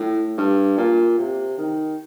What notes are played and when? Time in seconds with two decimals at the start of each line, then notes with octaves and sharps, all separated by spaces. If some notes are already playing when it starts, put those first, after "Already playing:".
Already playing: A2
0.37 G2
0.78 A#2
1.18 C3
1.58 D#3